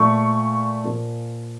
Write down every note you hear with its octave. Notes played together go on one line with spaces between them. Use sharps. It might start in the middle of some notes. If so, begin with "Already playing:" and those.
Already playing: A#2 F3 A3 C#6
A#2 F3 A#3